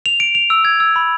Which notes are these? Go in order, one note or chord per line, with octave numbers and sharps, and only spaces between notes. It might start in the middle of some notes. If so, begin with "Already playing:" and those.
F7
D7
F7
E6
G#6
E6
B5